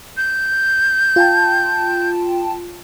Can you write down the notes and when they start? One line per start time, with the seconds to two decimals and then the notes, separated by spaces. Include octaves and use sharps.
0.17 G6
1.16 F4 G5 A5